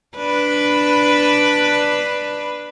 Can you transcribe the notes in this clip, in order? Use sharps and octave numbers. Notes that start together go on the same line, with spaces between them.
D4 B4